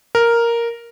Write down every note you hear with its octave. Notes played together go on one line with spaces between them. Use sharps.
A#4